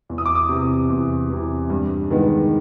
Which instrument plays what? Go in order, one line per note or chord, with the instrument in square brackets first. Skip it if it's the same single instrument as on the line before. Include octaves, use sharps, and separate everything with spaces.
[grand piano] E2
D#6
D6
D#6
C3 E3
E2
C3 E3
G2
D#3 G#3 B3